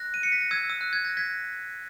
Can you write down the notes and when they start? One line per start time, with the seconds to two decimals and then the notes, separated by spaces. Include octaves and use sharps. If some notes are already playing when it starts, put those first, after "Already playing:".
Already playing: F#6 A#6
0.14 D#7
0.23 C#7
0.32 B6
0.41 A#6
0.51 E6 G#6
0.70 E6
0.81 F#6
0.93 G#6
1.05 A#6
1.17 G#6 B6